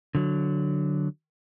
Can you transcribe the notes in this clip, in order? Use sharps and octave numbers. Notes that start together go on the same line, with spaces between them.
D3 F#3